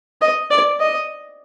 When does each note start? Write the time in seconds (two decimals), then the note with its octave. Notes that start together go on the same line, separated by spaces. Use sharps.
0.21 D#5
0.51 D5
0.79 D#5